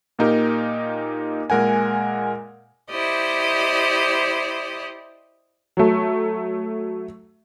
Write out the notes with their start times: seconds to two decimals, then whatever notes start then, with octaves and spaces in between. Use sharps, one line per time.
0.19 A#2 A#3 D#4 G4 A#4
1.50 A#2 G#3 A#4 F#5 G#5
2.90 E4 G4 C5 D5 D#5
5.77 F#3 A3